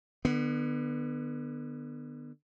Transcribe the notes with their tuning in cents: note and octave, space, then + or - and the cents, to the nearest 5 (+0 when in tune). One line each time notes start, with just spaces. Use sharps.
D3 +35 B3 +0